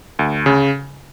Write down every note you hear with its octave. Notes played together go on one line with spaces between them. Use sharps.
D2
C#3